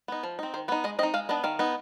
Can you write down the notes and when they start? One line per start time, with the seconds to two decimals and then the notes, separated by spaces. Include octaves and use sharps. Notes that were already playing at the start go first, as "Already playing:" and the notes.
0.08 B3 D#4
0.23 F3
0.39 C4 D#4
0.54 D#3 C5
0.68 B3 D#4 B4
0.84 G#3 D#5
0.99 C4 D#5
1.03 D#4
1.14 G#3 F5
1.29 B3 D4 D#5
1.44 D#3 F5
1.59 B3 D#4